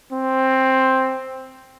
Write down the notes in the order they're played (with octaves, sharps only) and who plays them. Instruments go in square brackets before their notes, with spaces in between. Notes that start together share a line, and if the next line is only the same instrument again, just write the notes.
[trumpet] C4